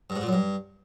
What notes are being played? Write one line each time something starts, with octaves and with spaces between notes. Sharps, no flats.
G2
G#2
A#2
F#2
G2